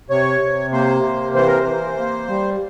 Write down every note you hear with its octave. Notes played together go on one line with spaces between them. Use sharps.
C3 C#5
C3
A#3 C5
C3
E3 C5
A#4
C5
E3
A#3
G3